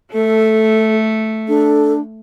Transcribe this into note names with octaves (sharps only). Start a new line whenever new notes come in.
A3 A4
D4 A4